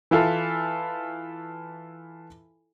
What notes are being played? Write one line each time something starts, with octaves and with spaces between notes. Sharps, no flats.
E3 E4 F4 A4